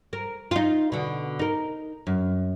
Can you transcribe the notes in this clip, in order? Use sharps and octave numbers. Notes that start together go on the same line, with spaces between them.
A#4
D#4 F4
B2 D3
D#4 A#4
F#2